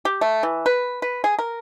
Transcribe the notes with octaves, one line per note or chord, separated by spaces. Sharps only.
G4
A3
E3
B4
B4
G#4
A#4